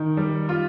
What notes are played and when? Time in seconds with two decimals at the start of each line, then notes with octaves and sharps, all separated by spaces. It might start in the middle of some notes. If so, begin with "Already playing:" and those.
Already playing: D#3
0.17 G3
0.49 F4